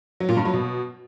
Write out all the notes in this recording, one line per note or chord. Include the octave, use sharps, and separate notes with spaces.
F#3
A#2
G2
F#3
B2